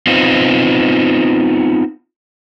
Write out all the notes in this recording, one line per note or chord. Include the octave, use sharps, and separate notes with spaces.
B3 C4 D#4 F4